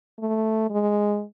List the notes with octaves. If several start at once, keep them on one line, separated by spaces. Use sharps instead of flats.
A3
G#3